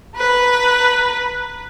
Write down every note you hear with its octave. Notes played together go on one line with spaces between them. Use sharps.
B4 A#5 F#6